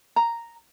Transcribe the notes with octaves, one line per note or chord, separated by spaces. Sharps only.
A#5